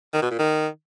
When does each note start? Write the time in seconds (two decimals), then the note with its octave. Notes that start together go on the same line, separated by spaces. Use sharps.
0.14 D#3
0.22 B2
0.31 A#2
0.39 D#3